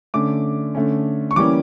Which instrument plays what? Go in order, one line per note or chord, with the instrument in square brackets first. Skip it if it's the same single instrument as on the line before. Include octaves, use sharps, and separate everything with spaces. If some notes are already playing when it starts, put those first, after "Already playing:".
[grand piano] D3 A3 C#4 D6
D3 A3 C#4
C#6
E3 G3 A#3 C#4 D6